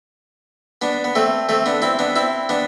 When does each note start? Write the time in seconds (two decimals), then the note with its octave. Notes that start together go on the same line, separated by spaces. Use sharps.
0.82 B3 D4
1.04 B3
1.15 A3 C4
1.49 A3 C4
1.66 B3 D4
1.82 C4 E4
1.99 B3 D4
2.16 C4 E4
2.49 B3 D4